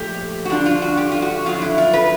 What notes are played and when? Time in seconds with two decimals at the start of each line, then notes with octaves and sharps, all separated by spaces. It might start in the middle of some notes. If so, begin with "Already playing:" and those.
Already playing: A#2 F3 A3 G4
0.45 F#4
0.50 G2 D3 F3 D4 F4
0.66 F4
0.82 F#4
0.97 G4
1.12 F4
1.22 F#4
1.45 F2 D3 F#3 F4
1.62 E4
1.78 F4
1.93 B4